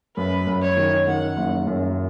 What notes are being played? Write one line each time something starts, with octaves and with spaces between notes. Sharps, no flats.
F#2 B4
F#2
C#5
D#3
D#3 F#5
F#1
F#2